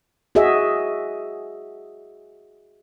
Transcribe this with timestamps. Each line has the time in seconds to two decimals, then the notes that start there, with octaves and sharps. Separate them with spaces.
0.35 F#4 G#4 D#5 E5